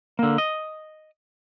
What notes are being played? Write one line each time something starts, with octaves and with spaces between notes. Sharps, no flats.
D3 A#3
D#5